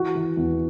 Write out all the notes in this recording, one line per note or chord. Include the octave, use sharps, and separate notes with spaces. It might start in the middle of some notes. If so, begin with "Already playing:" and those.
Already playing: E3 F#4
E3
E2